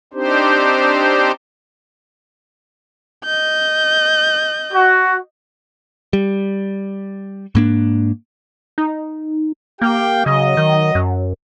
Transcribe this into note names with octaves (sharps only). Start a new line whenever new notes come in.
C4 D4 D#4 G4 C5
D#5 G6
F#4
G3
G#2 A#3 D4
D#4
A#3 G4 F5 G5
C#3 F#3 D#5
D#3
F#2